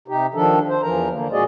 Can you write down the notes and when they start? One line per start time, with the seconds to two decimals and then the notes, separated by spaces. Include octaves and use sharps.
0.08 C3 D#4 G4
0.34 D#3 F3 D4 A4
0.68 C5
0.82 E2 E3 F3 A#4 A#5
1.12 D3 A#3
1.32 A#2 G#3 F#4 G#4 D5 D#5